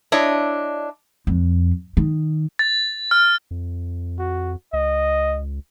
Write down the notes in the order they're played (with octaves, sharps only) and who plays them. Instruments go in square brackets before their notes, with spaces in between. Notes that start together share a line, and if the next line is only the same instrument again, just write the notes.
[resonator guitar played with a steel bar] D4 E4 C#5 D#5
[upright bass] F2
D#3
[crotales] A6
F6
[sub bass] F2
[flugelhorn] F#4
[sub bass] C#2 [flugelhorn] D#5